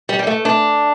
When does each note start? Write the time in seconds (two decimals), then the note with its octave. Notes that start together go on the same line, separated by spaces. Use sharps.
0.09 G3
0.19 G3
0.27 A3
0.45 D4